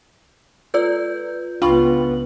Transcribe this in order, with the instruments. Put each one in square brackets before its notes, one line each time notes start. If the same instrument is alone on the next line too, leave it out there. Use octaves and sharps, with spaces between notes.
[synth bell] F4 B4 G6 [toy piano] A4 D5 E6
[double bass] C#2 B3 [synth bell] D4 F#7 [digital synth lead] F4 [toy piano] G5 B5 C#6